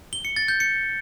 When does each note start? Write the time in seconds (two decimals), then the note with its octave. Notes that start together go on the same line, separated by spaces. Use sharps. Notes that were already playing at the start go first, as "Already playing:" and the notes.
0.13 G7
0.25 C#7
0.36 A6
0.48 G6
0.60 C#7